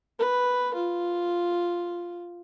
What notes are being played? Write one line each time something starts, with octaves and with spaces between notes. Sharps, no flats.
B4
F4